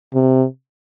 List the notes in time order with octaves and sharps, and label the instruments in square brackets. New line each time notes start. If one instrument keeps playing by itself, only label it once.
[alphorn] C3